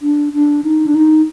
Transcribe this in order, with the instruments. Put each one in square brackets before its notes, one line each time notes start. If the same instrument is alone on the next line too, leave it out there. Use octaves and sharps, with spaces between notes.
[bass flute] D4
D4
D#4
D4
D#4